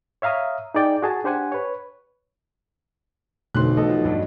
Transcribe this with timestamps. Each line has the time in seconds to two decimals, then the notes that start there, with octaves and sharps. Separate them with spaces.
0.22 C#5 E5 F5 A#5 D#6
0.75 D#4 G#4 D5 G5
1.02 F#4 G#4 A5
1.24 D4 G4 C5 F#5 G#5
1.52 B4 C#5
3.55 B1 F2 B2 D3 A3 C4 C6 F#6
3.77 E3 A3 F#4 A4 D#5
3.89 F3
4.05 G2 F#3 D4